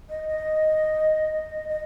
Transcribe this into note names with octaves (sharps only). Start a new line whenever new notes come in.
D#5
D#5
D#5